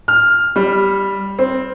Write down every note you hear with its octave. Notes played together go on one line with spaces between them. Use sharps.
F6
G3
C4